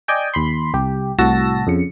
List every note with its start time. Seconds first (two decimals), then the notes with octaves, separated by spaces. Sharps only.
0.08 D5 D#5 G5 G#5
0.34 D#2 B5 C6
0.74 C2 G4
1.19 C2 A2 F#4 A5 E6 A#6
1.67 F2 C#3 C#7